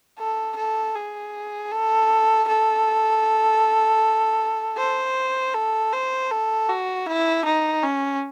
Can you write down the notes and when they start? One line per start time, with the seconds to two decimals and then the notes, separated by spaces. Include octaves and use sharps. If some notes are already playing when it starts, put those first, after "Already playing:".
0.19 A4
0.56 A4
0.95 G#4
1.72 A4
2.48 A4
4.77 C5
5.54 A4
5.93 C5
6.31 A4
6.69 F#4
7.07 E4
7.45 D#4
7.83 C#4